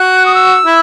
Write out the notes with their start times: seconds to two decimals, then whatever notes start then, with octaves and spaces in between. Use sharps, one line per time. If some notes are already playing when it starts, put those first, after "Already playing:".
Already playing: F#4 F#6
0.26 D#6
0.35 E6
0.65 E4